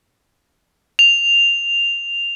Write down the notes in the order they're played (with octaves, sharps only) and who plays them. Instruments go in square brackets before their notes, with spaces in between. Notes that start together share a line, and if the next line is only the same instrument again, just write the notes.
[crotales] F7